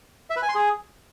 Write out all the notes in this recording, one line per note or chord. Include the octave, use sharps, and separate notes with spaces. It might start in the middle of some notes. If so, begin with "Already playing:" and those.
E5
B4
G#5
C6
G#4